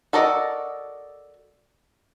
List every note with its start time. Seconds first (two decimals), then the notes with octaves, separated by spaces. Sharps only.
0.13 F#4 A4 A#4 D5 D#5